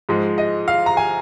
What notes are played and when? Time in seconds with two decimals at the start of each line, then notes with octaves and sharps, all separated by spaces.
0.09 G#2 F3 G#3
0.38 D#5
0.68 F5
0.86 A#5
0.97 G#5